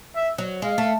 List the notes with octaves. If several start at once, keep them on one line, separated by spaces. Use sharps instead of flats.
E5
F#3
G#3 F5
A3